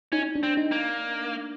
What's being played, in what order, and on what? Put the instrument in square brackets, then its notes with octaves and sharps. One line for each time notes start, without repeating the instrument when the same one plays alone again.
[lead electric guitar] C#4 [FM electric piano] D#4
[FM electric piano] D4
[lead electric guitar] C4
[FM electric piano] D#4
[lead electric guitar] A#3